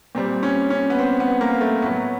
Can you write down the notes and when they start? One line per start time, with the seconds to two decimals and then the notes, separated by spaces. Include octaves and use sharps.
0.15 A#2 G3 C4
0.43 C#4
0.70 C#4
0.90 B3
0.99 C4
1.20 B3
1.41 A#3
1.61 A3
1.82 A2 F#3 B3